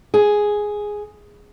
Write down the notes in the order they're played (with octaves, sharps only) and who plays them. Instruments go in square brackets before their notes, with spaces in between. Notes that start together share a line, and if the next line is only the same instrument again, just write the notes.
[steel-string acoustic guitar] G#4